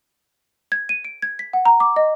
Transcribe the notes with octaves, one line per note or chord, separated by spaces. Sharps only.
G#6
D#7
D7
G#6
B6
F#5
A#5
D6
D#5